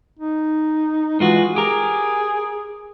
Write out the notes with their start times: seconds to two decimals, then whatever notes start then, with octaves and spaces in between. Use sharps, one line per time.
0.19 D#4
1.20 E3 G#3 F4 F#4
1.56 G4 G#4 A#4